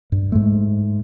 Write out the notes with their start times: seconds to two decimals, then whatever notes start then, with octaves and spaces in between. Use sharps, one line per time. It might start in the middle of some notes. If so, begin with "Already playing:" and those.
0.12 G2
0.32 G#2 G#3 A3